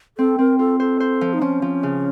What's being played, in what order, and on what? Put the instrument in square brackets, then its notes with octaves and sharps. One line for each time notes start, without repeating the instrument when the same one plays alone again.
[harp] C4 [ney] A4
[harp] C4 [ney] A#4
[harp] F4 [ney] A4
[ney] A4 [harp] C5
[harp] C5
F3
[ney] D#4
[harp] F3 [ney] C#4
[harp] F3
C#3